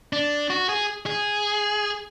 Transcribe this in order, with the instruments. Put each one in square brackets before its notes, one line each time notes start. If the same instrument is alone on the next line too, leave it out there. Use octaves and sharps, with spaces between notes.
[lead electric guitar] D4
F#4
G#4
G#4